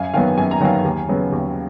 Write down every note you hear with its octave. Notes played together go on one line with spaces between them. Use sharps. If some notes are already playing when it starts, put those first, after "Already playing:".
Already playing: F#2 F5 G#5
D#3 F#3 B3 F5 G#5
F#2 G#5
A#5
D#3 F#3 B3 F5 G#5
D#2
C#3 F#3 B3
D#2